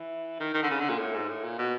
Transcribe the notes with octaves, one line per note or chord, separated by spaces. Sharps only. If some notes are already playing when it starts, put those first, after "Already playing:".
Already playing: E3
D#3
D#3
D3
C#3
D3
A#2
A2
G#2
A2
A#2
B2